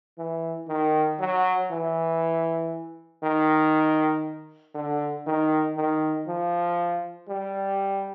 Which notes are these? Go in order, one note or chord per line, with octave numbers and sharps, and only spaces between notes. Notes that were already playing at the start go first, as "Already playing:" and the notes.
E3
D#3
F#3
E3
D#3
D3
D#3
D#3
F3
G3